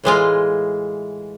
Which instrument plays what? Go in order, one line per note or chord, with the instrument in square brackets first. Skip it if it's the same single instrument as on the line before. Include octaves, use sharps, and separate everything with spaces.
[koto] A2 E3 G#3 F4